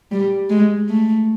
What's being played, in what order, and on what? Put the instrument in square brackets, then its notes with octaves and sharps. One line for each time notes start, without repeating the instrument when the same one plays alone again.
[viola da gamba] G3
G#3
A3